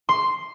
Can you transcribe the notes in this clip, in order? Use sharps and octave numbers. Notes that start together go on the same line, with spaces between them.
C6